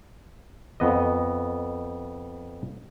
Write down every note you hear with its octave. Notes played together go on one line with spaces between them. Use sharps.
F2 B3 D#5